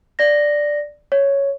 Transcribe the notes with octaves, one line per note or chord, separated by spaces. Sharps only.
D5 A#6
C#5